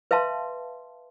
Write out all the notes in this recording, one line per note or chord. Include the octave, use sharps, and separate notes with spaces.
B4 E5 F5 A5 C6